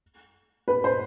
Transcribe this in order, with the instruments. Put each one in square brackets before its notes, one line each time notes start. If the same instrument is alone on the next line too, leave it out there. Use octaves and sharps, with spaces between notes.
[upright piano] B4
C5